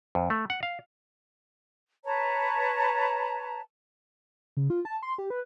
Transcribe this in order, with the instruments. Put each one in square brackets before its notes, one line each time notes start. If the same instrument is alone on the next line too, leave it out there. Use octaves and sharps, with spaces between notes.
[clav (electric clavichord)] F2
A3
F#5
F5
[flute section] B4 C#5 A5 A#5
[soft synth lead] C#3
F4
A5
C6
G4
B4